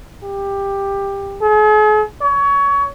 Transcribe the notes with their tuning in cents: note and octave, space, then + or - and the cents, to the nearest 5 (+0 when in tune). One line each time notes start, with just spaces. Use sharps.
G4 +15
G#4 +45
C#5 +25